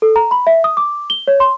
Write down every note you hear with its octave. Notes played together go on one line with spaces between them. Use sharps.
A4
A#5
B5
E5
D#6
D6
G7
C#5
C6